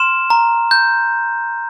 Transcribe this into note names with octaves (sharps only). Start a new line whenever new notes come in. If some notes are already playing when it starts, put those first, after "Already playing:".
Already playing: C6 F6 E7
A#5
G6